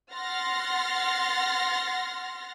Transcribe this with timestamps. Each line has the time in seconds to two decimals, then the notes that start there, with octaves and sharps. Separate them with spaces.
0.13 F#5 C6 F6 A6 A#6